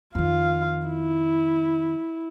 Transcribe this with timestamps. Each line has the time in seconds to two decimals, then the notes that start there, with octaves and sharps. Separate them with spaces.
0.15 F2 D#3 F4 F5
0.87 E4